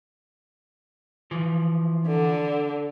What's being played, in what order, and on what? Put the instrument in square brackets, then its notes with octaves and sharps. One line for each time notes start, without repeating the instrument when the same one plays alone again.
[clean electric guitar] E3 F3
[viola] D3